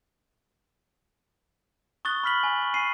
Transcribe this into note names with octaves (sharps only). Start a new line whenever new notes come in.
C#6 D#6 F#6 A6 G7
B5 F6 B6 F#7
G#5
C#6
G#5 C7 D#7